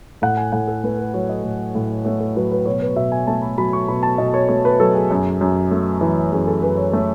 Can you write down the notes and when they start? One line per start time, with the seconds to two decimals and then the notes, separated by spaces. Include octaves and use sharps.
0.22 A2 F#5
0.37 G#5
0.52 A2 F#5
0.67 A4
0.84 A3 B4
0.99 B4
1.14 F#3 C#5
1.29 D#5
1.44 A2
1.75 A2
2.05 A3 C#5
2.20 A4
2.36 F#3 B4
2.52 B4
2.66 B2 C#5
2.82 B4
2.96 B2 E5
3.12 G#5
3.27 A3 A5
3.42 B5
3.58 F#3 B5
3.73 C#6
3.88 B2 B5
4.03 A5
4.18 B2 D#5
4.34 C#5
4.49 A3 C#5
4.65 B4
4.80 F#3 A4
4.95 G#4
5.11 F#2
5.41 F#2
5.71 A3
6.01 E3
6.32 F#2 G#4
6.47 A4
6.62 F#2 B4
6.77 C#5
6.93 A3 C#5